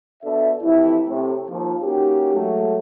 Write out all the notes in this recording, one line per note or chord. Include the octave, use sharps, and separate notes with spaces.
B2 D4 A4 E5
F2 A2 C3 E3 E4
A2 C3
D#2 F3
A#3 C#4 D#4 F#4 G4
F#3 G#3 A3